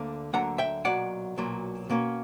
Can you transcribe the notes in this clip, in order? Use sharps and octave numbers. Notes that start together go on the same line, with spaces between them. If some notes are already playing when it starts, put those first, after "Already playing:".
Already playing: D2 D3 A#3
D2 D3 F#3 A#3 F#5 A#5
E5 G5
B1 A#2 F#3 D5 F#5
B1 A#2 F#3
B2 A#3 C#4